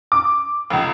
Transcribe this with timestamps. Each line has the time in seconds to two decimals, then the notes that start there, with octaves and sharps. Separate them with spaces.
0.12 D6
0.70 F1 C#2